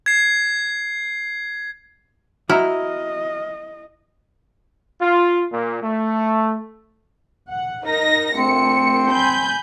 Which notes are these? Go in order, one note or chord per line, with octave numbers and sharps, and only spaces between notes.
G#6 C7
E4 F#4 D#5 A#5 F6
F4
A#2
A3
F#5
D#4 A#4 A#6
A#1 A3 C4 C#7
G#5 B5 G6